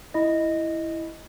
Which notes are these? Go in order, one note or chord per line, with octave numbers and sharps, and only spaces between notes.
E4 D#5